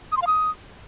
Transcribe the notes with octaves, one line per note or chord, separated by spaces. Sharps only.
D#6
C6
F5
D#6